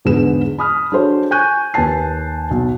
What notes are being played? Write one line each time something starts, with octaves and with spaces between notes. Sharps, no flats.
E2 G#2 D3 G#4 B4 E7
B5 D#6 F6
D4 F#4 G#4 A4 C5 C#5
G#5 C#6 F#6 G6 D#7
D#2 B4 G#5 A5 C7
B1